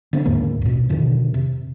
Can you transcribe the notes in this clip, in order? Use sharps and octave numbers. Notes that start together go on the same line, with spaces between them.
D3 B3 C4
D#2 G#2 D3 A#3
A1 B2
F2 B2 D3 D#3
C3